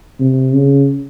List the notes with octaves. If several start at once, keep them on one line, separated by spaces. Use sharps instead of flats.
C3
C#3